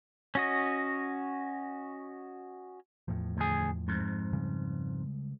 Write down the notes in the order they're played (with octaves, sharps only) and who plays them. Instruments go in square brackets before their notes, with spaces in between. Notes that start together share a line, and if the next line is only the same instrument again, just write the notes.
[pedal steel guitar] C#4 F#4 D#5
[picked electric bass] E2 A2 F3
[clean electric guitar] D2 G#4
F2 G#2
[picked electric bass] C#3 G3 G#3